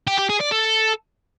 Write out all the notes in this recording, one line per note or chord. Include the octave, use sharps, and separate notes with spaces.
G4
G4
G#4
D5
A4